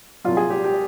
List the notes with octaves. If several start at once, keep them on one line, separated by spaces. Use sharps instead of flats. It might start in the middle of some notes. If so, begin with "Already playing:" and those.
C2 A#2 F#3 F4
G#4
G4
G4